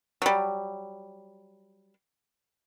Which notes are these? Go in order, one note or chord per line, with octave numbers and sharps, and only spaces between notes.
F#3 G3